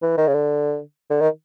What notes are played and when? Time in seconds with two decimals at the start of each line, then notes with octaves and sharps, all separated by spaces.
0.02 E3
0.18 D#3
0.27 C#3
0.34 D3
1.10 D3
1.21 D#3